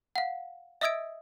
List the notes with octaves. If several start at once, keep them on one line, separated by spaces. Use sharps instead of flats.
F5 F#5
D#5 E5 D#6 E6 G#6 D7